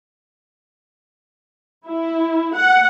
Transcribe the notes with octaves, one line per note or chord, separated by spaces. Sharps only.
E4
F#5